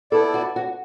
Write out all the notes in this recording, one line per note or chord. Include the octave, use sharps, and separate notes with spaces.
B3 E4 A4 D5
F#4
F#4